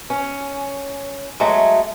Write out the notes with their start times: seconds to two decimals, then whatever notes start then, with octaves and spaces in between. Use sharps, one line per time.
0.10 C#4
1.40 F#3 G#3 A3